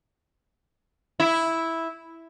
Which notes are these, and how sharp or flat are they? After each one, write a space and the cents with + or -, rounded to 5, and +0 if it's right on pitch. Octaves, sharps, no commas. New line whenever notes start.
E4 -5